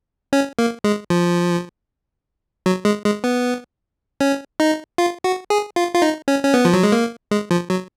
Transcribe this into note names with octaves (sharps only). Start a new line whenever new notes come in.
C#4
A#3
G#3
F3
F#3
G#3
G#3
B3
C#4
D#4
F4
F#4
G#4
F4
F4
D#4
C#4
C#4
B3
F3
F#3
G#3
A#3
G#3
F3
F#3